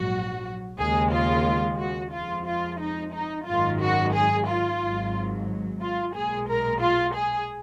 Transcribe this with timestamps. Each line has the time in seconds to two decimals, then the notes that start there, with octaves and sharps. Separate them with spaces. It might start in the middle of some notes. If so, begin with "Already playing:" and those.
Already playing: A#1 G#2 F#3 F#4
0.78 D#2 C#3 G#3 G#4
1.12 F4
1.78 F#4
2.12 F2 F3 G#3 F4
2.46 F4
2.79 D#4
3.13 D#4
3.46 G#1 F#2 D#3 G#3 F4
3.80 F#4
4.13 G#4
4.47 F4
4.80 G#1 G#2 F#3
5.80 F4
6.14 B1 A#2 G#3 G#4
6.47 A#4
6.81 F4
7.14 G#4